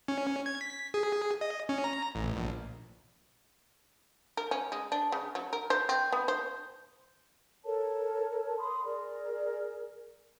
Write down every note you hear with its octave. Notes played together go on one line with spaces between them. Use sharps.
C#4
G#6
B6
G#4
D#5
C#4
A#5
A1
A#1
A#4
C#4
G#3
D4
C#3
F#3
A#4
C5
C4
B3
C5
A4 A#4 C#5 A5
B5 C6 D#6
G#4 A#4 D5